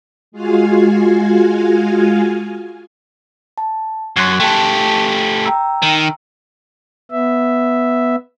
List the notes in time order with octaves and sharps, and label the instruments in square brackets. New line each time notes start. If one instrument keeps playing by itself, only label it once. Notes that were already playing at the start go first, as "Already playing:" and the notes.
[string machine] G#3 F4 F#4 F5 G#5
[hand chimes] A5
[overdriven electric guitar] F#2 [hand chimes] C6 F#6 G#6
[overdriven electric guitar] A3 G4 [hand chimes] G5 A5
[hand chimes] G5 A#5 E6
[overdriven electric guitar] D#3
[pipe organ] B3 E5